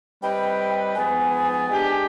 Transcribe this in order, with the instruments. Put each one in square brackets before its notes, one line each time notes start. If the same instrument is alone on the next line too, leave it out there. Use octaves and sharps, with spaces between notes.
[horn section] G3 C4 D#4 B4 [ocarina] G5
[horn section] G#2 F3 B3 [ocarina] G#5
[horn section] G#3 D4 G4